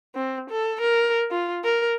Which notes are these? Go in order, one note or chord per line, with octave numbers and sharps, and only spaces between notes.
C4
A4
A#4
F4
A#4